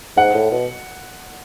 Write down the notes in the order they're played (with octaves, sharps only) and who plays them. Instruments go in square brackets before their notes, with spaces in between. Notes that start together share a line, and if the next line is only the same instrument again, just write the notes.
[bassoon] G#2 [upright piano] F#5
[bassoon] A2
B2